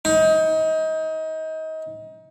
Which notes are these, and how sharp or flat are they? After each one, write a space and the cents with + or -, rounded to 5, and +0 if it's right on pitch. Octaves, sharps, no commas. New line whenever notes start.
D#4 +30